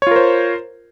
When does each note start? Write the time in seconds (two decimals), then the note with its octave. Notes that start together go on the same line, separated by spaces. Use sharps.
0.02 C#5
0.07 F4
0.11 A#4
0.16 C5